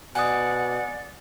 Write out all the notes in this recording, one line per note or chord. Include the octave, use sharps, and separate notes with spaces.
B2 D5 F#5 G#5 D#6